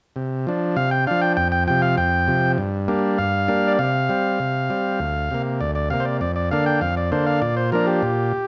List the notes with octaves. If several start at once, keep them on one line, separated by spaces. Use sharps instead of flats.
C3
F3 D4
C3 F5
G5
F3 D4 F5
G5
F2 G5
G5
C3 F3 G5
F5
F2 G5
C3 F3
G2
G3 A#3 D4
G2 F5
G3 A#3 D4
D5
C3 F5
G3 C4
C3
G3 C4
D2
C3 A#3
D2 D5
D5
C3 A#3 F5
C5
D5
F2 D5
D5
D3 A#3 D4 F5
G5
F2 F5
D5
D3 A#3 D4 C5
F5
A#2 D5
C5
F3 A#3 D4 A#4
G4
A#2